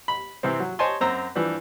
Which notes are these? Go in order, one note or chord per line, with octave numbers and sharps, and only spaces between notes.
B5
C3 E3 C4
F#3
C5 C#5 D#5 G#5 A5 C6
F#2 C4 A#5 E6
G2 E3 F3 G3